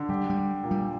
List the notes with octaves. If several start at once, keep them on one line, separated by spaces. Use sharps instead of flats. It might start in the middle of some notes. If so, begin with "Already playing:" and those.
Already playing: D3
G3 G4
G3
G4
A#2
G3